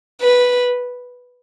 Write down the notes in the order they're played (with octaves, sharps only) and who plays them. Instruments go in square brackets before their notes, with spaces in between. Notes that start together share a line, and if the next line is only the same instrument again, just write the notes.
[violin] B4